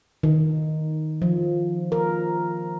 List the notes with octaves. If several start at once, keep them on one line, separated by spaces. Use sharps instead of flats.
D#3
F3
A#4